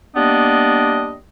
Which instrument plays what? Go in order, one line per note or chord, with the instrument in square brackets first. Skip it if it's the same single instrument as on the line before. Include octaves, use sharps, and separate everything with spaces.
[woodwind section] G3 A#3 B3 D4 D#5